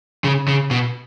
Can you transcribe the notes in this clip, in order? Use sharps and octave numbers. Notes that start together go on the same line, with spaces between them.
C#3
C#3
B2